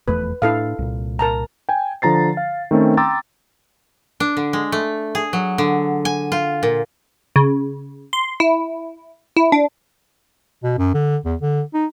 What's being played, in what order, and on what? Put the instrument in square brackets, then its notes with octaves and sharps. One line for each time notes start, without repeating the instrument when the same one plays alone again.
[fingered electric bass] F1 E2 A3 [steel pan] B4
[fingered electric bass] A2 D4 [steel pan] E4 A4 F5
[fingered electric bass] C2 A#2
[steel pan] A#4 A5 A#5
[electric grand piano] G5 G#5
D3 F3 A#5 A6 C7
F5
D#3 A3 C4 C#4
G5 A#5 C6 D6 E6 A6
[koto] D4
D3
G#3
A3
G#4
F#3
D3
G#5
F4
A#2
[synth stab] C#3
C6
E4
E4
D4
[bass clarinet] B2
F#2
D3
E2
D3
D#4